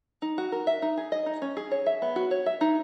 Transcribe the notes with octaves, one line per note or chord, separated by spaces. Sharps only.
D#4
F#4
A#4
E5
D#4
G#4
D#5
D#4
C#4
G#4
C#5
E5
B3
F#4
C#5
E5
D#4